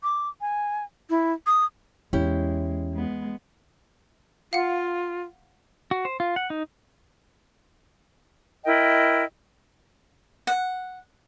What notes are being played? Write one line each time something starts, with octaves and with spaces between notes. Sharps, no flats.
D6
G#5
E4
D#6
E2 G#3 C#4 E4 G4
G#3 B3
F4 F5 F#5
F#4
C5
F4
F#5
D#4
E4 A#4 D#5 G5
F#5